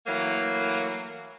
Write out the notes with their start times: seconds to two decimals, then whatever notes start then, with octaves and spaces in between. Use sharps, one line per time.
0.07 E3 F#3 A3 A#3